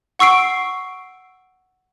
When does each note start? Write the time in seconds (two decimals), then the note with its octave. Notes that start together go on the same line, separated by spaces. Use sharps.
0.19 F#5 C#6 E6 C7 D7